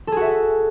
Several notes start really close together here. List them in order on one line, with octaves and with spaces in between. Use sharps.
A4 G#4 F#4 E5